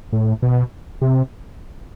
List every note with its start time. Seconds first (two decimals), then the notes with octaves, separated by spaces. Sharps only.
0.12 A2
0.42 B2
1.02 C3